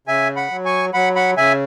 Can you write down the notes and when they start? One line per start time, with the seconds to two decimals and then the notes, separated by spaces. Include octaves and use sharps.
0.07 C#3 E5 G#5
0.36 F#5 B5
0.51 F#3
0.65 G#5 C#6
0.94 F#3 F#5 B5
1.16 F#5 B5
1.37 C#3 E5 G#5